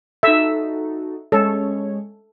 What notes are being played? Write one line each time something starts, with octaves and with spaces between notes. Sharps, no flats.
D#4 F#4 A4 E5
G#3 C#4 A4 C#5